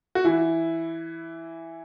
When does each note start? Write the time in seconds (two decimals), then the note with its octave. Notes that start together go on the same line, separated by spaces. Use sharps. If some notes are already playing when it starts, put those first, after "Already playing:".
0.15 F#4
0.25 E3 E4